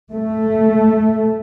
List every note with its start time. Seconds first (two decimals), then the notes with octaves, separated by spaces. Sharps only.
0.13 A3